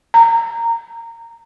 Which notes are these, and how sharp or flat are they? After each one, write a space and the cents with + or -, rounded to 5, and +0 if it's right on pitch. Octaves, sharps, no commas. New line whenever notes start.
A#5 -15